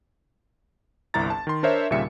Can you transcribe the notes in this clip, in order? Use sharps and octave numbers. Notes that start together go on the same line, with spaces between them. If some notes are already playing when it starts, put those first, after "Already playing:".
G1 C2 E4 A#5 A6
A5
D#3 C6
D4 A#4 C5 C#5 E5
D#2 A#2 C#3 G3 E5 C#7